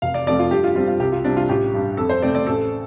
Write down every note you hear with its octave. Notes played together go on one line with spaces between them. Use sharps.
F1 F5
D5
F2 F3 A3 C4 D5
F4
G2 G4
F4
G3 C4 F4
F4
C2 G4
F4
C3 G3 C4 D4
F4
A1 G4
G2 G3
F2 A4
C5
C3 A3 C4 D5
D5
A1 A4